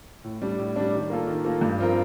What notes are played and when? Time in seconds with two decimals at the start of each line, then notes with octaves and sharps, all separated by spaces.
0.24 A2
0.42 G3 D4
0.59 A2
0.76 G3 D4
0.93 D#3
1.10 A#3 F4 A4
1.27 D#3
1.45 A#3 F4 A4
1.61 G2
1.78 F3 C4 F4 A#4